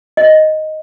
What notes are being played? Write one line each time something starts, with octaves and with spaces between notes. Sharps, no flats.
D#5